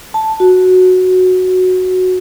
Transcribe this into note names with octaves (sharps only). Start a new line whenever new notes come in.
A5
F#4